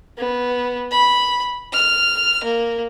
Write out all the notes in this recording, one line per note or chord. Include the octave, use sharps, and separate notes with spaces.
B3
B5
F6
A#3